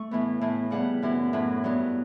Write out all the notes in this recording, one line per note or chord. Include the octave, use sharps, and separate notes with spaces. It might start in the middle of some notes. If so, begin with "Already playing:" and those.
Already playing: A3 C#6
A2 E3 B3
A2 E3 B3
C#3 G3 B3 F#5
F#2 E3 B3
A2 F#3 B3
G2 F#3 B3